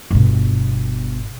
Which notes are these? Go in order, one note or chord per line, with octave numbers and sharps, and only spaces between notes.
G1 B2